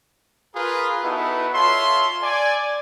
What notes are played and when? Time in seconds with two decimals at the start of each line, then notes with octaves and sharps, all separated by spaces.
0.56 F4 G#4 A#4 B4
1.04 B3 D#4 E4 F#4 A4 B4
1.53 F4 A4 C#5 E5 C6
2.23 D5 G#5